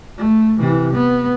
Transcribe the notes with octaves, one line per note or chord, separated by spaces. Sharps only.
A3
C3 E3
B3